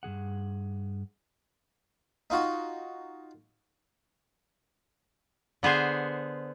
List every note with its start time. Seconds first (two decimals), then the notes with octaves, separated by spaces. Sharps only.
0.03 G2 D#3 G#4 F#5
2.30 D#4 F4 F#4
5.63 D3 B3 G#4 C5